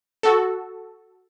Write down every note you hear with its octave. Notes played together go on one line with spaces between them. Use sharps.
F#4 A4